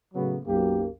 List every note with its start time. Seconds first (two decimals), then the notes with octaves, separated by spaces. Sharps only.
0.14 A2 C#3 F#3 B3
0.46 B1 F#2 A#3 G4